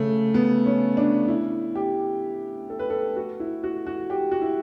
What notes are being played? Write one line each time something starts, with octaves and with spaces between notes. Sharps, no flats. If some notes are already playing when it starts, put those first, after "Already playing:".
Already playing: C#3 A3
B3
C#4
D4
E4
G4
A4
B4
A4
F#4
E4
F#4
F#4
G4
F#4
E4